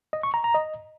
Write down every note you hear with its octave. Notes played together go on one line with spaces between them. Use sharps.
D#5
C#6
A#5
A#5
D#5